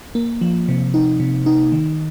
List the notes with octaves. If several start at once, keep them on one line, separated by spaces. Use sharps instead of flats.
A#3
F3
C3
D#4
C3
D#4
D#3